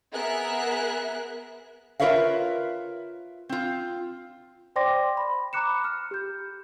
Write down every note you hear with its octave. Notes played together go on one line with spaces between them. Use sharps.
B3 G#4 A#4 E5 F#6
F4 A#4 B4 C#5 E5 F5
C4 F4
C5 D5 G5 C6 D6 A#6
B5
A#5 B5 D6 F#6 C#7 E7
F6
G4 G6